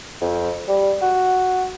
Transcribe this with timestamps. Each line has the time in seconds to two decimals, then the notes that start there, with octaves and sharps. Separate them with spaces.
0.21 F2
0.68 G3
1.01 F#4